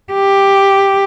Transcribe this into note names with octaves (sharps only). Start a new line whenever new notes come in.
G4